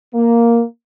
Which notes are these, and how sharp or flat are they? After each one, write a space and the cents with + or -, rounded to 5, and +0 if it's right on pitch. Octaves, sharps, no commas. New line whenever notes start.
A#3 +0